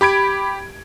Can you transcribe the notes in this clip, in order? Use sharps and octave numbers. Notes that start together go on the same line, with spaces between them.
G4 B5 G#6 D7